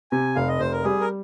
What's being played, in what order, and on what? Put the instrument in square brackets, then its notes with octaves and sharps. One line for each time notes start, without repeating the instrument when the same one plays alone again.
[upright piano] C3 [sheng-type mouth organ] G#5
[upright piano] F1 [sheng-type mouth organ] F5
[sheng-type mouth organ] D#5
[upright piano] F1 [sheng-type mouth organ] C5
[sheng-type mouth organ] A#4
[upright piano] G3 [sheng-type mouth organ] G#4
[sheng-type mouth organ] A#4